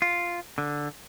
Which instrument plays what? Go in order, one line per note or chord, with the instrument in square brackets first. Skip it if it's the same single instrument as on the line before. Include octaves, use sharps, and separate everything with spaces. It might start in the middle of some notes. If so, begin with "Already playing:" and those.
[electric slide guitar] F4
D3